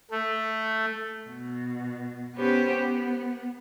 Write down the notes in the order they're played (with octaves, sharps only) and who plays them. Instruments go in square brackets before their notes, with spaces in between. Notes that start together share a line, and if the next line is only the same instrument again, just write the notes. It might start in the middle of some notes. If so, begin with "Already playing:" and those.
[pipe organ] A3
[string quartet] B2
B3 C#4 G4 B4 C5
B3